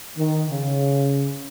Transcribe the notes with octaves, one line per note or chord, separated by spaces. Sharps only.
D#3
C#3